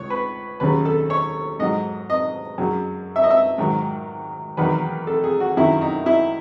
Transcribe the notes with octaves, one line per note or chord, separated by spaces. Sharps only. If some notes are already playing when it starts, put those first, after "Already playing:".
Already playing: C#2 C#5
B4
D#2 C#3 F#3 B4
A4
C#5
G#2 F#3 D#5
D#5
F#2 C#3 F#3
E5
D#5
E5
G#2 D#3 F#3
E2 D#3 F#3 B4
A4
G#4
F#4
F#2 D#3 F#3 E4
D#4
E4